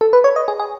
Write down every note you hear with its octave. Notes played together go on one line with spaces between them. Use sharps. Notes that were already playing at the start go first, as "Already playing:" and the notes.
A4
B4
C#5
D#5
G#4
G#4